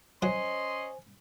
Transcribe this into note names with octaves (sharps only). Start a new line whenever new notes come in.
F#3 C#4 C5 D#5 G#5 C6